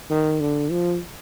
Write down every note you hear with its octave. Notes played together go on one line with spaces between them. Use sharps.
D#3
D3
F3